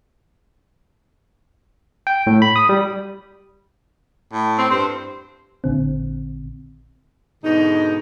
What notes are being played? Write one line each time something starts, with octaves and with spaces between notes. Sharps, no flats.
G5
A2
B5
D#6
G3
A2
C4
G2 C5
A1 A#2 D3 C4
G#2 B2 D3 D#4